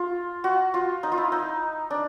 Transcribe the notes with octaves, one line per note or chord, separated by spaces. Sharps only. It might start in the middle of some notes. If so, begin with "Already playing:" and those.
Already playing: F4
F#4
F4
D#4
F4
E4
D#4
D4